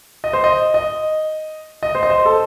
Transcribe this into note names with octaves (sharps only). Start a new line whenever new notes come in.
D#5
C5
D#5
D#5
D#5
C5
D#5
C5
A4